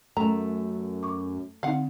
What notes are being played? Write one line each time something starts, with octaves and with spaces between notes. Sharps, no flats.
F#2 A3 A#5
C#6 D6
D3 C4 D#4 F5 F#5